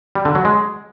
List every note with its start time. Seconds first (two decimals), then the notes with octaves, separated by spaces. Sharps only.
0.15 G3
0.25 D3
0.35 F#3
0.45 G#3